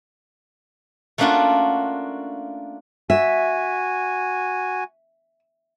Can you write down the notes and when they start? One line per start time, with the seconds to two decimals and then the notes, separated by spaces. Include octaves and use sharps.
1.18 A3 A#3 C#4 D4 F4 F#4
3.10 F#4 E5 G#5